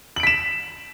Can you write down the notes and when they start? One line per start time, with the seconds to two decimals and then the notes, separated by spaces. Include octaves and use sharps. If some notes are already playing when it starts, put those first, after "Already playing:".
0.16 F#7
0.20 D7
0.23 B6
0.27 E7